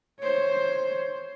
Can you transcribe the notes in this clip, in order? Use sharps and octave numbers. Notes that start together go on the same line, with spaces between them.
C5 C#5